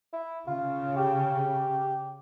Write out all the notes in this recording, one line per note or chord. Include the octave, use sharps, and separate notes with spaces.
E4
C#3 F4
G4